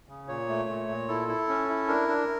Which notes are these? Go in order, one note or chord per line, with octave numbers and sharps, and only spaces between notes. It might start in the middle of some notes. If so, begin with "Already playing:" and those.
C#3
A#2 C#5
A3
A#2
A#2
E4 A4
E4
C#4
E4
D4 A#4
D4